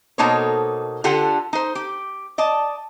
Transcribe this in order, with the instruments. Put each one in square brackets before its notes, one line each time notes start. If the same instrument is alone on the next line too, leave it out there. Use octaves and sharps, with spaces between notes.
[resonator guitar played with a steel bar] B2 A#3 D#4 A4 C5 C#5
D3 F4 G4 A4 F#5
D#4 C5
G4
D5 D#5 A5